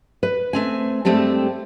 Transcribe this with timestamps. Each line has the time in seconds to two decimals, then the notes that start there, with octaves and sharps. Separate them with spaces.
0.23 B4
0.53 A3 C4 G#5
1.05 G2 G#3 A3 C4 G4 A5